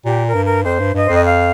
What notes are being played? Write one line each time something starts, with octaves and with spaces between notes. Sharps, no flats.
A#2 G4
A#4
G2
A#4
F2 C5
G2
G2 D#5
C5
F2
D#5
F5